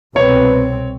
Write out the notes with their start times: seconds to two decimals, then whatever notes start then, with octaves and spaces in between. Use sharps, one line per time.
0.16 C2 B2 C4 B4 C#5